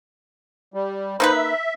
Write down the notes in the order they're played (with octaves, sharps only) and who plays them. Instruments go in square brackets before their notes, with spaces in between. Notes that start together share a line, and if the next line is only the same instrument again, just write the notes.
[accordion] G3
[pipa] A#3 D#4 B4 [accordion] C5 B5
[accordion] E5